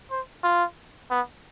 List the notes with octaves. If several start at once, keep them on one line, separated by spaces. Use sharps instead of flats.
C5
F4
B3